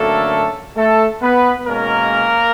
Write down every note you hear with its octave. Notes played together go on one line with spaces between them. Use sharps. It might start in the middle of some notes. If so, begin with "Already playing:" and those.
Already playing: F#2 D3 F#3 A3 A#3 A4
A3 A4
B3 B4
B2 G#3 A#3 C#4 A#4